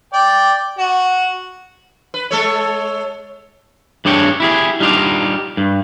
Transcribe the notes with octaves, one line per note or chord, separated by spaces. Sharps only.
D5 G5
F#4
B4
G#3 A4 C#5
G2 D4 G#4 C#5 G5
E4 G4 G#4
G3 D4 D#4 F4 G4
G2